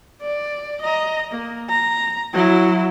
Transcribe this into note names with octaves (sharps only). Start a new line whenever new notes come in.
D5
D#5 A#5
A#3
A#5
F#3 E4